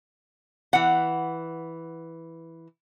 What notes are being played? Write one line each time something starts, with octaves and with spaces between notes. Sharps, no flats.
E3 F#5